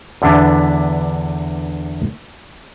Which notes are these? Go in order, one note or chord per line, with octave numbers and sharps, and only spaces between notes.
E2 D3 B3 D4 E4